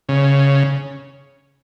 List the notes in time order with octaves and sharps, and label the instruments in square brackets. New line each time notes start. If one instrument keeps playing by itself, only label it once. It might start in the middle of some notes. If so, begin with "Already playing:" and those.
[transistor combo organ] C#3